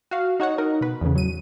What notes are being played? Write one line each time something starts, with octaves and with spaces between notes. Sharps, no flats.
F#4 F5
D#4 F#4 C#5 F#5
D#4 A#4
B2 B4
E2 A2 C#3
F#3 D#7